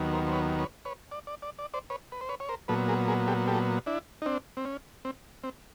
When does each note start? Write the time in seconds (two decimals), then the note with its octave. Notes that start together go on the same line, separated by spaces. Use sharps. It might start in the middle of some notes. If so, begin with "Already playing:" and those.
Already playing: D#2 D#3 F#3 B3
0.13 A#4 C5
0.27 C5
0.33 B4 C#5
0.59 B4 C#5
0.85 B4 C#5
1.11 D5
1.27 D5
1.42 D5
1.59 D5
1.74 C5 D5
1.90 B4 C#5
2.12 B4
2.21 C5
2.29 B4 C#5
2.40 C#5
2.49 A#4 C5
2.68 A#2 F#3 B3 A4 B4
2.88 G#4 A#4
3.08 G#4 A#4
3.28 G4 A4
3.47 G4 A4
3.86 D4 E4
4.22 D#4
4.26 C4 D4
4.57 C4
4.65 C#4
5.05 C4
5.44 C4